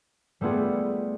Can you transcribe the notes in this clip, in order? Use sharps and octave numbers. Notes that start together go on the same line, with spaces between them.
G3 A3 B3 F4 G#4